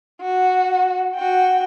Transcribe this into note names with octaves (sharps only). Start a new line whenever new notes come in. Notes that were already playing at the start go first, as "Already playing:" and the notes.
F#4
F#4 G5